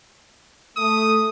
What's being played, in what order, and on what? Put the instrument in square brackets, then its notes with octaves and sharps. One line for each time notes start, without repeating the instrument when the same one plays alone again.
[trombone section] A3 [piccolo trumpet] D#6